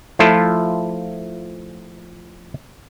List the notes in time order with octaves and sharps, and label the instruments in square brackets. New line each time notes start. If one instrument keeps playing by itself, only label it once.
[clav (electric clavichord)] F3 A3 E4 F4 A4